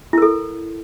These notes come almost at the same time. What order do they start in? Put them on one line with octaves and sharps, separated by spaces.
E4 A#4 A4